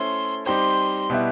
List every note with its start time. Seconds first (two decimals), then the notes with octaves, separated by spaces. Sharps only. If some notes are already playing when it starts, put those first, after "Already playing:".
Already playing: A3 C#4 E4 A4 C5 C6
0.46 G3 C4 D#4 G4 C5 C6
1.10 B2 G3 B3 E4